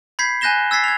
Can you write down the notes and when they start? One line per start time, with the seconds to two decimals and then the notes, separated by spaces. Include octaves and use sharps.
0.19 B5 G6 G#6 B6 C7
0.41 G#5 F#6 G6 A#6 E7 G7
0.71 E6 G#6 A6 B6 C7
0.84 G#6 F7